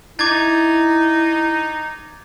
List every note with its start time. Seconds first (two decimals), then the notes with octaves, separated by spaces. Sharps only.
0.19 D#4 E4 D6 G#6 A6